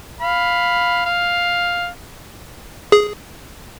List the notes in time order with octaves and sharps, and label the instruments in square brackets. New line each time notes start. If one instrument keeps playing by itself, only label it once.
[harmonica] F5 B5
F5
[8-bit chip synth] G#4